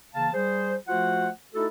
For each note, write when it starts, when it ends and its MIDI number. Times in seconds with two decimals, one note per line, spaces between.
0.14 0.29 49
0.14 0.29 52
0.14 0.29 58
0.14 0.29 77
0.14 0.29 81
0.34 0.74 55
0.34 0.74 68
0.34 0.74 72
0.88 1.28 53
0.88 1.28 57
0.88 1.28 65
0.88 1.28 66
0.88 1.28 72
0.88 1.28 78
1.54 1.66 57
1.54 1.66 63
1.54 1.66 64
1.54 1.66 66
1.54 1.66 69